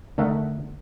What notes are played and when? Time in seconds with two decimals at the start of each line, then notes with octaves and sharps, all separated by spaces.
0.18 D3 A3 D#4 A#4 E5 F#5